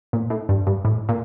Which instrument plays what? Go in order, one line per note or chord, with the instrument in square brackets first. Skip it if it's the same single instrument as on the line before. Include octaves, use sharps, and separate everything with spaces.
[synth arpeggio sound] A#2
A2
G2
G2
A2
A#2